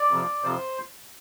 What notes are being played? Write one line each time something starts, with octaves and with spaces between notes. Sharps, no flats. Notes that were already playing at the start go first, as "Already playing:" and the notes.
Already playing: D5
F2 C3 F3
F2 C3 F3 C5